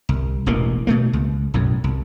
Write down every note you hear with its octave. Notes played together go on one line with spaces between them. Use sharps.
C2
E1 A1 B2 A#3
B2 A3 A#3
C#2
B1 F#2 A2
C2